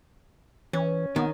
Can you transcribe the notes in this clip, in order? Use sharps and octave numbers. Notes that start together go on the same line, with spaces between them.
E3 C#4
D#3 B3